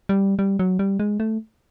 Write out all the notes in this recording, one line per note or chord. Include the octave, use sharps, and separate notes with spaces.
G3
G3
F#3
G3
G#3
A3